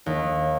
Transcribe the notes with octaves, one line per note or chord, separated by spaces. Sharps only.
D#2